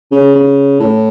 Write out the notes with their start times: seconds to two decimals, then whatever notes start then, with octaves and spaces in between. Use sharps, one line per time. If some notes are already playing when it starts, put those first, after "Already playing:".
0.12 C#3
0.35 C#3
0.80 A2